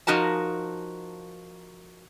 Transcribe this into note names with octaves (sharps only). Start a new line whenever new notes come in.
F3 D#4 F#4 A#4 A5